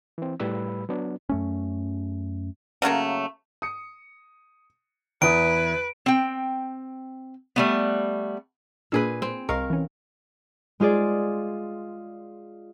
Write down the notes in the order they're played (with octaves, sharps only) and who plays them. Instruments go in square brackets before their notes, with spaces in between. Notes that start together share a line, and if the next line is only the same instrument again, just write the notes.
[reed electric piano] E3 C4
A2 G3 B4 B5 E6
F#3 B3 D4
[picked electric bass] F#2 A3 C#4
[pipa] C#3 F#3 A3 A#3
[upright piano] D#6 C#7
[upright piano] E2 E4 D#6 [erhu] B4 [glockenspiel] D7
[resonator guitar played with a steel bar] C4 G5
G3 A3 B3
[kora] A#2 G#4 B4 [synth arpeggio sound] A#3 D4 E6
[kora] C4
[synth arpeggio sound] C2 D#5 C#6 [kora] A#4 F5
[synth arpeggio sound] E3 C#4
[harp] G#3 F4 G#4 D5